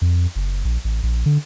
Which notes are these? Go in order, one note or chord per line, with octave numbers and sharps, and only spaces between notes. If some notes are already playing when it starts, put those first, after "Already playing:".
F2
F#1
A#1
A1
A#1
D3